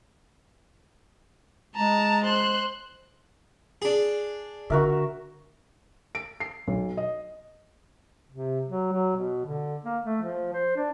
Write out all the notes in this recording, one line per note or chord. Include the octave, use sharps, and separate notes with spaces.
G#3 A5 A#5
C5 F#6
D4 G#4
D3 F#4 A#4 E5
D7
C7
B1
D#5
C3
F#3
F#3
B2
D3
A#3
A3
F3
C5
D4